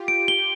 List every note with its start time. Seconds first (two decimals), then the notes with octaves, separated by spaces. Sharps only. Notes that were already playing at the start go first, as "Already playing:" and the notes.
Already playing: F4 G4
0.08 D7
0.28 G7